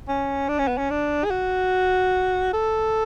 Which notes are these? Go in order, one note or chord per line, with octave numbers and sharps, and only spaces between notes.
C#4
D4
C#4
B3
C#4
D4
G#4
F#4
A4